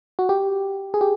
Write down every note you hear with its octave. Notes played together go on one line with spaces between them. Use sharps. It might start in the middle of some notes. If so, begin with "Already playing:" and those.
F#4
G4
G#4
G4